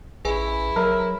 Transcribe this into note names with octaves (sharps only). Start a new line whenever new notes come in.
A1 E4 G#4 B4 G#5
F#3 A#4 E5